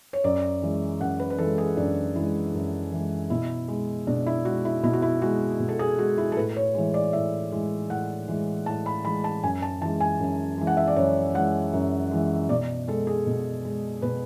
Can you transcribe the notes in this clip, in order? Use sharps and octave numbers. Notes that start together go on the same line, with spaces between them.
C#5
F#2 D5
E3 G#3
F#2 F#5
B4
B4
E3 G#3 A4
G#4
F#2 D4
E3 G#3 E4
F#2
E3 G#3
B2 E4
G#3
B2 D4
E4
G#3 F#4
E4
B2 E4
F#4
E4
G#3 F#4
B2
A4
G#4
G#3 F#4
E4
A4
A2 B4
C#5
E3 G#3
D5
A2 E5
E3 G#3
A2 F#5
E3 G#3
A2 A5
B5
E3 G#3 B5
A5
F#2 G#5
A5
E3 G#3 A5
G#5
F#2
E3 G#3
F#5
E5
D5
F#2 C#5
E3 G#3 F#5
F#2
E3 G#3
B2 D5
G#3 A4
G#4
B2
G#3
B2 B4